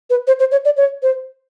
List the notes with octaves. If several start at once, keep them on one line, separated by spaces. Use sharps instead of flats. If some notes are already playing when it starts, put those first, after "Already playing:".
B4
C5
C5
C#5
D5
C#5
C5